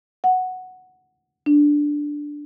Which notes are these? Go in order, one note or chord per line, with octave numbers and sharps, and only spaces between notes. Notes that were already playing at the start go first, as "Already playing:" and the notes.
F#5
D4